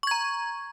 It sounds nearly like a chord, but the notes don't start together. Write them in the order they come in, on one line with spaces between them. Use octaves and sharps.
C#6 G#6 A#5